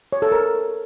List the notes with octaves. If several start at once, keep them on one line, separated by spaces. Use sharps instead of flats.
C#5
A4
A#4